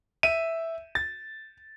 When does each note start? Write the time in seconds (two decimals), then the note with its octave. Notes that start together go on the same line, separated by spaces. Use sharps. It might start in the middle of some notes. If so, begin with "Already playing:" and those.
0.23 E5 D#7
0.95 A6